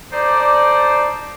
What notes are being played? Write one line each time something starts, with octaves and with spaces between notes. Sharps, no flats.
D#4 A4 C5 D5